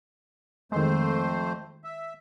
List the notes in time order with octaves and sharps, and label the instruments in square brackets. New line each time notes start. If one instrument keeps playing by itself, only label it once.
[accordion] F2 A3 C5 [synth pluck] D#3 G#3
[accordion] E5